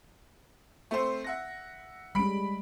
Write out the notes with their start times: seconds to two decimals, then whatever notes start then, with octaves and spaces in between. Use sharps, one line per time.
0.91 A3 C4 C5
1.24 E5 F#5 A#6
2.15 G3 G#3 C#4 B5 D7